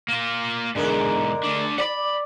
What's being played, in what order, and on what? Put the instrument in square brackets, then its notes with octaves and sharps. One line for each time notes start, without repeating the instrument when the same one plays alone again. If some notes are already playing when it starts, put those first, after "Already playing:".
[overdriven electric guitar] A#3 F4
[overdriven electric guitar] E2 G#2 [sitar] D3 G#3 A#4
[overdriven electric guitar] A3 D4
[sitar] D5 [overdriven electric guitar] F#5 B5